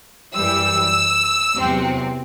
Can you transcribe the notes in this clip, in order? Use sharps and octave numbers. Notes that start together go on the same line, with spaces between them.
F#2 E3 G3 E6
E2 C3 F#3 C4